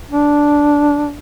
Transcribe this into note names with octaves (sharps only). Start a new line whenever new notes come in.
D4